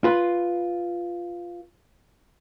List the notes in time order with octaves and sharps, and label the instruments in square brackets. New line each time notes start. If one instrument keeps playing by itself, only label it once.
[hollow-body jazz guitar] F4 B4